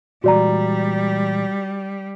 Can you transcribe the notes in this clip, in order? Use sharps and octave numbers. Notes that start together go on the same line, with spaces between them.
A#2 E3 G3 G#3 F#4 D5 A#5